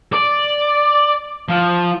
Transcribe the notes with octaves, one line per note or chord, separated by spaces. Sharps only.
D5
F3